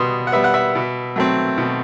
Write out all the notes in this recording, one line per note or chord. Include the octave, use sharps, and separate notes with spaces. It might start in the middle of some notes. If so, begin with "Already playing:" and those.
Already playing: B2 G3 B3 C6 D#6
F#5
G3 B3 E5
F#5
E5
B2
F#3 A3 C4
B2